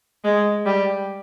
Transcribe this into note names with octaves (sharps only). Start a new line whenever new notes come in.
G#3
G3